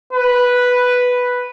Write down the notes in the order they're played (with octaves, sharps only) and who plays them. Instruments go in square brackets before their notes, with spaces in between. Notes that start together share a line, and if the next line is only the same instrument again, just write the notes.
[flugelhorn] B4